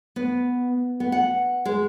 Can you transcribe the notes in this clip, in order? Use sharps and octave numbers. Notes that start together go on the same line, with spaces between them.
B3
B3
F#5
G#3